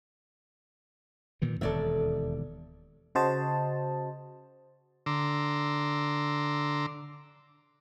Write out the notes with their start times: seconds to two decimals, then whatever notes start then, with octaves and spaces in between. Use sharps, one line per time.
1.42 A#2 D#3 E3
1.61 E1 D#2 A4 D5 E5
3.15 C#3 F#4 C5 D#5 A5
5.06 D3 A#5 C6 D6 E6